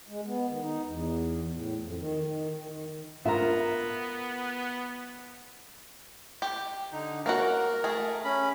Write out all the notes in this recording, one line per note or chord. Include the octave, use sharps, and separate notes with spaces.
G#3
B3
D#3
D#4
E2
A2
F2
D#3
D#3
D#3
D#3
B3 F4 A#4 E5 A#5
G4
D3 D#4
A#3 C#4 F#4 A#4
A3 G#4
C#4 B5